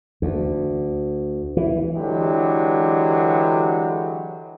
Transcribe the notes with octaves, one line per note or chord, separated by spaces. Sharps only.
D2
E3
D3 E3 F#3 G#3 G4